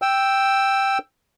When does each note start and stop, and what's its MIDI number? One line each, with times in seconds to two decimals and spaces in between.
0.02 0.98 79
0.02 0.98 88